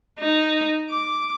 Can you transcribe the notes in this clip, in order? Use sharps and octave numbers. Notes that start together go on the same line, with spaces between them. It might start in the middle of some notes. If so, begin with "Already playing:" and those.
D#4
D6